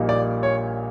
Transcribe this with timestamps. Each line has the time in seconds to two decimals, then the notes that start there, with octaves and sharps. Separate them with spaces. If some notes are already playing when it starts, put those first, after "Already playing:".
Already playing: A#1 A#2 G3 A#3 D#4
0.09 D5
0.43 C#5